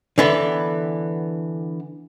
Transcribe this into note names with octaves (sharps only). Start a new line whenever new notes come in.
D3 E3 B3